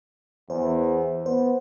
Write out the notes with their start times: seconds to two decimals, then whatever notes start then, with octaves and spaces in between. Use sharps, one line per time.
0.50 E2 C5
1.26 B3 C5